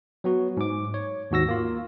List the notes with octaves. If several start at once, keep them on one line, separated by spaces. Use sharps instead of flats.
F#3 B3 F#4
G#2 D6
C#5
D#2 G#2 F#4 E6 A#6
A#3 F4